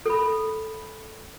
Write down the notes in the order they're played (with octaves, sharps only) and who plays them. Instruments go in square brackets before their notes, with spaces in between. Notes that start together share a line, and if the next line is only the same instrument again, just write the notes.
[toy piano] A4 B5